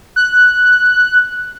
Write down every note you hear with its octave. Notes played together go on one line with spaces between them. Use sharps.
F#6